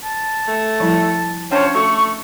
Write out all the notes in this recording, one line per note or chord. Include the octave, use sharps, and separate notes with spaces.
A5
A3
F3 G3 E4
F3 C#4 D4 C#5 G5
A3 F#4 A4 C#6